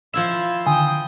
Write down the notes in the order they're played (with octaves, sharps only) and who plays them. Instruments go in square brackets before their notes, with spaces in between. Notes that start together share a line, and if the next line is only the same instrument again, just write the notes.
[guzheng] F3 E4 E5 [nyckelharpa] F4 [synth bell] E7
[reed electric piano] D3 D#3 [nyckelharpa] G5 D#6 [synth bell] G#5